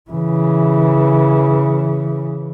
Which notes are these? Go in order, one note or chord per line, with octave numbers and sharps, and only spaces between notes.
C#3 E3